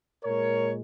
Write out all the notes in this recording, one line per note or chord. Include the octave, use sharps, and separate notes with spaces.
A#2 G#3 A#4 C#5